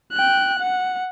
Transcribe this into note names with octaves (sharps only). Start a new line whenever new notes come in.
G5 F#6
F#5